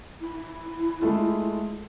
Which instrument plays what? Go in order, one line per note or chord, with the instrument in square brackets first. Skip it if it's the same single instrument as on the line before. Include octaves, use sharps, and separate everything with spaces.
[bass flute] E4
[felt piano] G#3 A3 F4